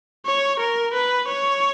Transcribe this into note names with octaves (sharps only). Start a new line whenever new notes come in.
C#5
A#4
B4
C#5